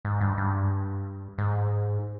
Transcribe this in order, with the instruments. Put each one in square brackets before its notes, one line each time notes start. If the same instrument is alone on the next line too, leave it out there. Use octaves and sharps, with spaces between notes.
[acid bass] G#2
G2
G2
G#2